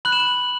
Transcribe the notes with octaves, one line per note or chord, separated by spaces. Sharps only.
B5 F#6 F#7
E7
F#7